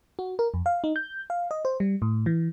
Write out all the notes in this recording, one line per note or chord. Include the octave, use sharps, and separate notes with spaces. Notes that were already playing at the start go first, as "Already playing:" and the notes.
F#4
A#4
F2
F5
D#4
G6
F5
D#5
C5
G3
A2
E3